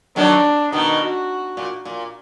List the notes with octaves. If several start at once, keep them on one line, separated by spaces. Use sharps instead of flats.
D#3 F#3 D4
B2 D#3 D#4
F#4
A#2
A#2